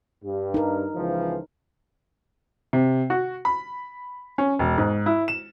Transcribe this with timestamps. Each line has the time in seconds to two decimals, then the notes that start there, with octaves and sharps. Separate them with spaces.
0.25 G2
0.54 D#4 A#4
0.95 C#2 E3 F3
2.73 C3
3.10 F#4
3.45 B5
4.38 C#4
4.59 E1
4.78 G#2
5.06 E4
5.28 E7